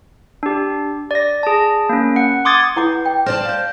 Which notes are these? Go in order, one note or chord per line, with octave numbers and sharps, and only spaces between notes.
D4 G4
D5 A#6
G#4 A5
A#3 C#4
F#5
C6 D6 D#6 G#6 A6
E4 B4 F#5 D6 G6
G5
C5 D5 A5 F6 A#6
F5 G6